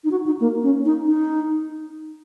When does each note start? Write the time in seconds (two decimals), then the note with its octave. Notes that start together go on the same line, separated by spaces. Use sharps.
0.04 D#4
0.11 F#4
0.26 D#4
0.40 A#3
0.63 C#4
0.85 D#4
1.06 D#4